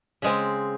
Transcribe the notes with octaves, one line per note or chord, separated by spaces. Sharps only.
C#3 G#3 C4